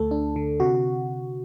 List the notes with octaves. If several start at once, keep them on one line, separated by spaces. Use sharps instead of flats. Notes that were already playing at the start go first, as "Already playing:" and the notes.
Already playing: D2 D3 A3 A4
D4
D3
C3 F#4